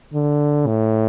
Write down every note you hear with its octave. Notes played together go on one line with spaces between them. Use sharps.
D3
A2